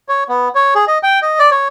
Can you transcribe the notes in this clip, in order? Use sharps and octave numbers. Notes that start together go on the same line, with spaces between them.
C#5
B3
C#5
G#4
D#5
G5
D#5
D5
C#5